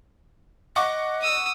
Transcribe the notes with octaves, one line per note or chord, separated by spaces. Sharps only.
D#5 F#5 C#6 D6
D#6 E6